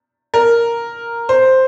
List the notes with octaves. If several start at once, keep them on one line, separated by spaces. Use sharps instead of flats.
A#4
C5